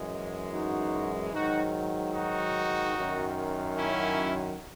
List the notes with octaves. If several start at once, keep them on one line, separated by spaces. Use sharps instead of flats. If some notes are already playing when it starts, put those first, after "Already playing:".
Already playing: F#2 E3 G#3
D#4 F#4
G#2 D#3 F#3 D#4 F#4
D#4 F#4
F#2 D#3 F#3
C#4 E4